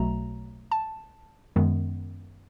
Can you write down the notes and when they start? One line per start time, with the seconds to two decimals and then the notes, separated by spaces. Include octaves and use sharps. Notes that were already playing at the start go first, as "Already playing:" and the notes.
Already playing: B1 B2 F#3 A3 A#5
0.71 A5
1.56 F#2 D#3 G#3 B3